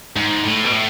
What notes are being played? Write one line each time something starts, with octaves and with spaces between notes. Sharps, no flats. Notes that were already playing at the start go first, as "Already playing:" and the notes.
G#2
A2
B2
A2